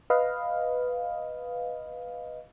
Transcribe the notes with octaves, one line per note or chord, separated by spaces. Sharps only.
B4 D#5 F5